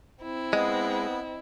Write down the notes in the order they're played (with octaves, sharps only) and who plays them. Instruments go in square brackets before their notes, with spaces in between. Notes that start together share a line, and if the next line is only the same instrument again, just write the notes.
[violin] C4 E4
[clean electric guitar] G#3 [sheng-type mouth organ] B3 [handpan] D#5